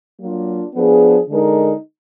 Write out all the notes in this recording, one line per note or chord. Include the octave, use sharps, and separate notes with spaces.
F#3 A#3 D4 F4
F3 B3 D4 G#4
D3 G#3 D#4 A#4